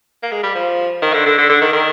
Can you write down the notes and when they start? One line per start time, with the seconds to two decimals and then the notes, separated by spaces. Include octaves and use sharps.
0.23 A#3
0.32 G#3
0.43 G3
0.55 F3
1.02 D#3
1.14 D3
1.26 D3
1.38 D3
1.49 D3
1.61 D#3
1.73 D#3